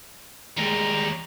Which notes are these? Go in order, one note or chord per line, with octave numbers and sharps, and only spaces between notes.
D#2 G3 G#3 A#5